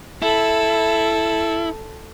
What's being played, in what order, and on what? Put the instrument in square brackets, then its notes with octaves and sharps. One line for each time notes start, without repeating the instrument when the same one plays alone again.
[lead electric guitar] E4 [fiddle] A4